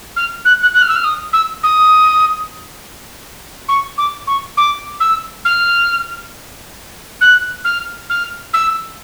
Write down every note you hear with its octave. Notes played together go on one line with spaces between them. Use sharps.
F6
F#6
F#6
F#6
F6
E6
F6
D#6
E6
D#6
C#6
D6
C#6
D6
E6
F6
F#6
F6
F6
E6